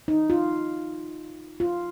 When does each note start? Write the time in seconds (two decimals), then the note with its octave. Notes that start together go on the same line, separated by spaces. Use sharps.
0.08 D#4
0.30 F4
1.60 F4